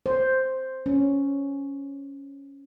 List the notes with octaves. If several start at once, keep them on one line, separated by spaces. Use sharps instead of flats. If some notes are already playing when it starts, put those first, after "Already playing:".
C5
C#4